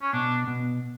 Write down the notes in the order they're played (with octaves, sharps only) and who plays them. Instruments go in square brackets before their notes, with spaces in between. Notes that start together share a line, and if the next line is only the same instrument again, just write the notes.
[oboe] C#4
[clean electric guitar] B2 [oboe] D4
[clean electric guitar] B2